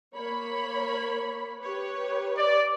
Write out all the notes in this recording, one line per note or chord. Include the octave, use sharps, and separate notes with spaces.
A#3 C#5 B5
G4 B4 C#5
D5